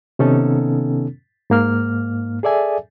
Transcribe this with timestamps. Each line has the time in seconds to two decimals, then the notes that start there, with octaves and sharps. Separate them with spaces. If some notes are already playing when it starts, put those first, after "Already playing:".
0.19 C3 D#3 B3 C#4 D#4 A4
1.50 G#2 A#3 F6
2.43 G#4 A4 D5 E5 G#5